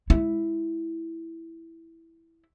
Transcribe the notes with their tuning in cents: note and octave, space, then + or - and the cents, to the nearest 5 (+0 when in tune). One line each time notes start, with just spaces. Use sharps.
G#3 +25 E4 +0